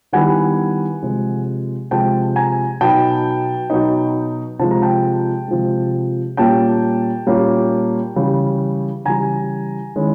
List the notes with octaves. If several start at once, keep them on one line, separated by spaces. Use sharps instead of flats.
D#3 G3 B3 E4 F#5 G#5
C3 F3 G#3
C3 F3 G#3 G5 A5
G#5 A#5
B2 F#3 B3 D#4 G5 A5
B2 F#3 B3 D#4
C3 F3 G#3 A5
A#5
G5 A5
C3 F3 G#3
A#2 G3 A#3 C#4 G5 A5
A#2 G3 A#3 C#4
C#3 E3 G3
C#3 E3 G3 G#5 A#5
D#3 G#3 C#4 E4